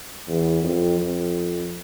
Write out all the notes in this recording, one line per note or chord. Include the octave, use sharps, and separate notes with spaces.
E2
F2
F2